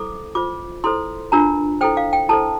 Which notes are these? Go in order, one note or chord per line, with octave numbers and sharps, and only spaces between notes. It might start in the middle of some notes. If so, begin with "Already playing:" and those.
Already playing: E4 A4 C5 D6
F4 C5 D6
E4 A4 C5 C6
D4 F4 A#4 A#5
E4 A4 C5 G5
F5
G5
E4 A4 C5 A5